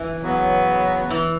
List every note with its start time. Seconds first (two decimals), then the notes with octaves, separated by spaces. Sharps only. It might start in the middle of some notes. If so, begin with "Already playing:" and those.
Already playing: E3
0.23 C#3 F#3 B3
1.10 E3